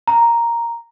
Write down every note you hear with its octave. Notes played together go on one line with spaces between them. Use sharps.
A#5